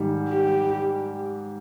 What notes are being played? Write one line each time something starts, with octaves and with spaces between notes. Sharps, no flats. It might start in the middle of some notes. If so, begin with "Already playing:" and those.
Already playing: G#2 D#3 G3
G4